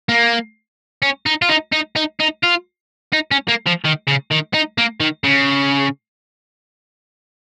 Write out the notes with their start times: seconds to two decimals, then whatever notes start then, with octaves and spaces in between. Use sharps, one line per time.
0.09 A#3
1.02 C#4
1.26 D#4
1.42 F4
1.49 D#4
1.73 D#4
1.96 D#4
2.20 D#4
2.44 F4
3.13 D#4
3.31 C#4
3.48 A#3
3.66 F3
3.85 D#3
4.07 C#3
4.31 D#3
4.54 D#4
4.78 A#3
5.01 D#3
5.24 C#3